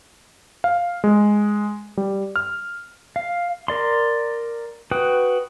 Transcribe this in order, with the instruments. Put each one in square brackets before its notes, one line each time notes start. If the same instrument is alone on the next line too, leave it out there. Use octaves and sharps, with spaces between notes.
[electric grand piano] F5
G#3
G3
F6
[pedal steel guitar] F5
A#4 D5 C6
F#4 B4 G5 D#6